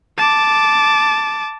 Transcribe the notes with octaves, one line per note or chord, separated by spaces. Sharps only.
A5 D6